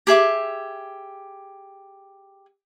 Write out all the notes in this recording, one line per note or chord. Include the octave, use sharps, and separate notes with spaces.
G4 G#4 E5 D6